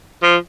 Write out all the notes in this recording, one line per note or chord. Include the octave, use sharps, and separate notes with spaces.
F3